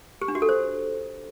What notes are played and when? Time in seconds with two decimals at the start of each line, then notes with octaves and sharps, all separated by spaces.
0.22 G4
0.28 D4
0.35 F#4
0.42 A4
0.49 C5